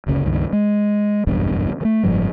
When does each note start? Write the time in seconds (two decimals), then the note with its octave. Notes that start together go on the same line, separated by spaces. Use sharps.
0.06 F#1 D2 C#3
0.25 C#2 G2 D#3
0.53 G#3
1.27 F#1 B1 E2 G2
1.81 D#3 A3
2.03 F#1 G#2 F3 G3